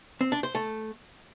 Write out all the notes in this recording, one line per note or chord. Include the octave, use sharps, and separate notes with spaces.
C4
D4
C5
A3